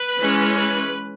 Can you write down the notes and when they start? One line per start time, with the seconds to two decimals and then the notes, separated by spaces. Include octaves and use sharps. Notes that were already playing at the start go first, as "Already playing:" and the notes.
Already playing: B4
0.19 E3 G#3 C#4
0.56 B4